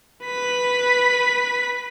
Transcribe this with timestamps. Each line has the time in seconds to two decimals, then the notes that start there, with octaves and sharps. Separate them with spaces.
0.25 B4 B6